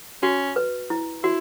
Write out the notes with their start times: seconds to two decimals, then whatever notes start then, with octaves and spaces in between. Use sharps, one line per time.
0.23 C#4 F#4
0.56 B4
0.90 E4
1.23 E4 F#4